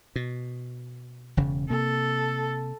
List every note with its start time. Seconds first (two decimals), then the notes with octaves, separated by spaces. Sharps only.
0.16 B2
1.37 E1 C#3
1.70 C3 A#3 A4